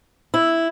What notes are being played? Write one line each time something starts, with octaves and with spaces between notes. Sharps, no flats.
E4